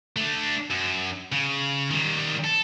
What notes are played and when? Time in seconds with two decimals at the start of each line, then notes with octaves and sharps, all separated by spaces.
0.16 A3 D4
0.71 F#2
1.32 C#3
1.90 D#3 G3
2.44 A4